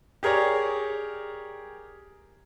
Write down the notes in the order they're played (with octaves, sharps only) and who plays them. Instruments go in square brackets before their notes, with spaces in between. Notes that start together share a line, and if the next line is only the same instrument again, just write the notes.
[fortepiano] G4 G#4 A#4 C#5 D5